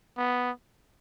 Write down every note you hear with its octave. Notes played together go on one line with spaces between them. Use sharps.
B3